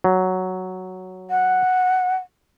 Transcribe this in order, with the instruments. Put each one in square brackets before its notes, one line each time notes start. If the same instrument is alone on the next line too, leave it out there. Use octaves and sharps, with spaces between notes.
[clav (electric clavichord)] F#3
[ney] F#5